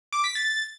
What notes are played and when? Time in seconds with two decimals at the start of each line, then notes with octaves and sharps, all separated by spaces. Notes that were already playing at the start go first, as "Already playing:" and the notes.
0.13 D6
0.24 B6
0.35 A6